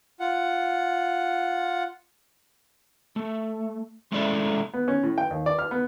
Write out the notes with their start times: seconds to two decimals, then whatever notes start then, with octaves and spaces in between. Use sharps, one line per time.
0.20 F4 F#5
3.16 A3
4.12 G#3 A3 C#4 E4 D5 E5
4.74 B3
4.88 C#4
5.03 A2
5.18 G5
5.31 D#2
5.46 D5
5.59 F6
5.71 B3